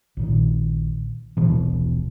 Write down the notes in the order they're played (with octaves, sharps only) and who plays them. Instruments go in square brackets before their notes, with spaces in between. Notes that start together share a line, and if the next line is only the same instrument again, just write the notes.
[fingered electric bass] A#1 A#2 D#3
D#1 B1 B2 E3